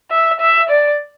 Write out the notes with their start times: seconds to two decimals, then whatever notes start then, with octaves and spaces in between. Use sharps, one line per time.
0.11 E5
0.40 E5
0.69 D5